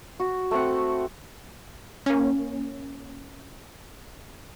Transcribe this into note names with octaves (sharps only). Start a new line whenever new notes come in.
F#4
A3 C4 F#5
A#3 C#4